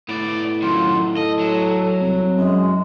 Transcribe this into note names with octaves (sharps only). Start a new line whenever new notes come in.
A2 B3 D5
F#2 D#3 F4
A4 D#5
F#3
C2
F#2 G#3